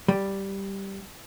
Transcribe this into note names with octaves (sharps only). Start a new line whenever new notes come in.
G3